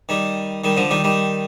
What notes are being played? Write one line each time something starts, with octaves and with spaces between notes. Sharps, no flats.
D#3 G3
D#3 G3
D3 F3
D#3 G3
D#3 G3